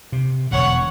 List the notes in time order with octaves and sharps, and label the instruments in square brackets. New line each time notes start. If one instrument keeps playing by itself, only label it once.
[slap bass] C3
[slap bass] E1 D3 [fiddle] C#5 F#5